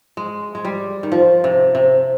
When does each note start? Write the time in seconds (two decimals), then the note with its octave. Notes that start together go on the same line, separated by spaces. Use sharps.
0.17 G#3
0.55 G#3
0.65 G3
1.03 D#3
1.12 F3
1.44 C3
1.75 C3